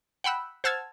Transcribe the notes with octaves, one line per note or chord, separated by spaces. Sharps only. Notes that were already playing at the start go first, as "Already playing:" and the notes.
F#5 G5 B5 E6 F#6
C5 F#5 A5 E6 F6 G#6